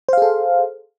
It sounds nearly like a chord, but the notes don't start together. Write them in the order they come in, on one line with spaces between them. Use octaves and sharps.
C5 F5 G#4 A4